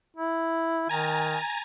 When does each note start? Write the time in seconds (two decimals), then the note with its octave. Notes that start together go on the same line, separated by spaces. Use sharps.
0.16 E4
0.89 D#3 G#5 A#5 A6